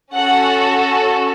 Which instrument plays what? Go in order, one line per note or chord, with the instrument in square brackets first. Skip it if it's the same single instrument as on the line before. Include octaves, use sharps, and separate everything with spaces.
[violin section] C#4 F#4 A4 F#5